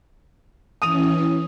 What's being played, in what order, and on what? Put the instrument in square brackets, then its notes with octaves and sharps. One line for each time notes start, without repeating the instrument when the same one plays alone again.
[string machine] E3 C#4 [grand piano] D#6 D#7 F7